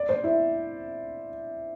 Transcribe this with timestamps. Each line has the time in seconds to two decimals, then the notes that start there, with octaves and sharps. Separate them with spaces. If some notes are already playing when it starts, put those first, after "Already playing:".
Already playing: D5
0.09 C5
0.24 E4